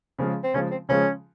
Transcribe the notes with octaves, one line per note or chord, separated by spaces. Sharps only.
C#3 F3 G#3
C4
C#3 F3 G#3 C#4
C4
C#3 F3 G#3 C#4